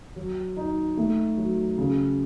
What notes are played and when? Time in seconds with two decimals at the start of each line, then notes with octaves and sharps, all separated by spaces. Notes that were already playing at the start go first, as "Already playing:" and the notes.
0.16 F#3
0.57 D#4
0.97 A3
1.38 F#3
1.78 C#3